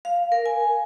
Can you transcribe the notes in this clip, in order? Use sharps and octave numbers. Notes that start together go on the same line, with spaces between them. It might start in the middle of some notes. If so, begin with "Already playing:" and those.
F5
A#4
G#5